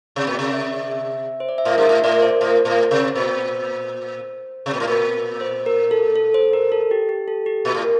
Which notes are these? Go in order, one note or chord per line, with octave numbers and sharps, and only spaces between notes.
C3 D5
A#2
C3 D5
E5
D5
E5
C5
D5
E5
A2 F5
G2
A2 E5
A2 D5
C5
A2
A2
C3
A#2 C5
C3
A#2
A2
A#2
C5
A#4
A4
A4
C5
A#4
A4
G4
G4
A4
G4
A#2
A2